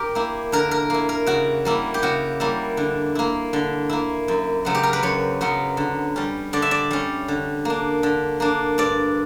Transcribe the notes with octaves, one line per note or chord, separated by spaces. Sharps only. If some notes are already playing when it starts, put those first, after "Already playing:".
Already playing: G4 A#4
A#3 E4
D3 A#4
A#4
A#3 E4
A#4
C#3 F#4
G3 A#3 E4
G4
C#3 F#4
G3 A#3 E4
D3
A#3 E4
D3
A#3 E4
F#2
C#3 F#3 B3
G4
A#4
B4
F#2 C#5
C#3 F#3 B3
D3
G3 C#4
D3 D5
E5
D5
G3 C#4
D3
A#3 D4
D3
A#3 D4
G2 D5